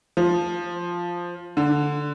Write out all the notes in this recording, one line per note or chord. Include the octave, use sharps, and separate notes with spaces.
F3
D3